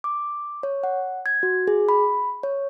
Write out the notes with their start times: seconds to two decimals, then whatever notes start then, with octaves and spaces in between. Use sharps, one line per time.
0.04 D6
0.63 C#5
0.83 F#5
1.26 G#6
1.43 F#4
1.67 G#4
1.89 B5
2.43 C#5